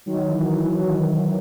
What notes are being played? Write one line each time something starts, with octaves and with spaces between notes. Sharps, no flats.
D#3 F#3
E3